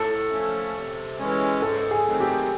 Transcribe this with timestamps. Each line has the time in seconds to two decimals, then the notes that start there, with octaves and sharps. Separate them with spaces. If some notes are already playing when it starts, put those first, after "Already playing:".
Already playing: A2 A4
0.31 F3 A3 C#4
0.75 C3
1.19 E3 G#3 C#4
1.62 G#2 A4
1.91 G#4
2.06 D#3 F#3 A3 C4
2.20 G4